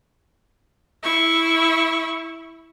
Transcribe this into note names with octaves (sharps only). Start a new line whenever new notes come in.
E4 C#6